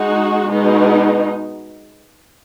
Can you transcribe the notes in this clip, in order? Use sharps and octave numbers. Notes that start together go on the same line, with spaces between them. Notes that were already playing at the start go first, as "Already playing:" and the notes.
Already playing: G#3 D#4 F#4
B2 G#3 D#4